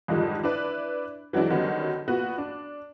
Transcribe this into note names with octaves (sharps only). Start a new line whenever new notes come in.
F2 G#2 D3 D#3 F3 G3
D4 E4 B4 D5
E3 F#3 G#3 D4 E4
D3 D#3 F#3 G3 B3 C#4
A#2 B3 F#4
D4